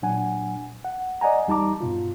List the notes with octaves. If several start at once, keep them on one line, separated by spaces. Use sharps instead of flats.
A#2 F#3 D4 F#5 G#5
F#5
D5 D#5 F#5 G#5 A#5
E2 G3 D#4 A5 A#5 D6
G2 B2 F4